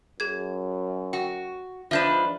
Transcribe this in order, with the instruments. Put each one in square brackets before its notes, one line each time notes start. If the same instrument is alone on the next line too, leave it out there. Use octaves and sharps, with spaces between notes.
[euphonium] F#2 [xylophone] G#4 G#6
[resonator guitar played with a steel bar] F#4 [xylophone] G5
[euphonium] G#2 [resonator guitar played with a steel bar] F3 D4 B4 [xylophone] E5 G6 E7